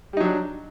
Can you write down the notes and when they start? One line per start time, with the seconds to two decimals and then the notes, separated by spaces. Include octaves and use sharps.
0.13 G3
0.17 D#4
0.20 F#3
0.24 D4